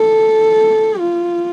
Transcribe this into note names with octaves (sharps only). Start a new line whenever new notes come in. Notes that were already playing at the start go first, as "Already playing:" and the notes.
Already playing: A4
F4